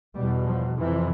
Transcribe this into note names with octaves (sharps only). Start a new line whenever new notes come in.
E2 B2 G3
F3
F2 C3 E3